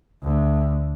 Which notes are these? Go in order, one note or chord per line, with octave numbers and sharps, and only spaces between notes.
D2